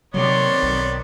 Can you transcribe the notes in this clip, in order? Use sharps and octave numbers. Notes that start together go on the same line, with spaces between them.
C3 D#3 F#3 B3 C4 C#5 D5 C6
B1